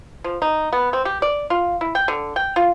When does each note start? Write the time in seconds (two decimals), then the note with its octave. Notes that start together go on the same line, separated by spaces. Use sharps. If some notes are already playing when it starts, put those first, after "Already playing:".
0.24 F3
0.42 D#4
0.73 B3
0.93 C4
1.05 G4
1.22 D5
1.50 F4
1.81 E4
1.95 G5
2.08 D3
2.36 G5
2.56 F4